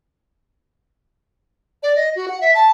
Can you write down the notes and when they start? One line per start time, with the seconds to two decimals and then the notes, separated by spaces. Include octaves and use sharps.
1.83 D5
1.96 D#5
2.16 F#4
2.28 F#5
2.41 E5
2.55 A5